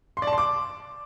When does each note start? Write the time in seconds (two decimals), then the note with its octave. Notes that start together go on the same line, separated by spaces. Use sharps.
0.17 C6
0.22 D5
0.27 A5
0.33 C6
0.38 D6